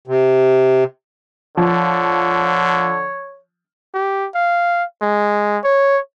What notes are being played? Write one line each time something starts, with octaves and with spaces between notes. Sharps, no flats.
C3
D3 F3 C#5
G4
F5
G#3
C#5